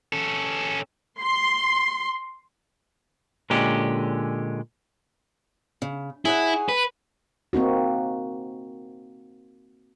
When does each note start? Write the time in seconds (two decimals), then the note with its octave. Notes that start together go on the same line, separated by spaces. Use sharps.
0.13 C#4 A4
1.20 C6
3.50 A#2 D3 G#3 C#4 G4
5.82 C#3
6.25 E4 G#4 C#5 F#5
6.69 B4
7.53 A#3 C4 D#4 F#4